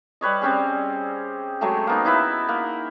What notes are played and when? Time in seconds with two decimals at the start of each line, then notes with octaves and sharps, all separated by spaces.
0.21 G3 B4 C#5 D#5
0.42 G3 C4 C#4 G#4
1.61 F#3 G#3 A3 G4
1.87 A#3 B3 D#4
2.05 D#4 E4 B4 E5
2.48 A#3 F#5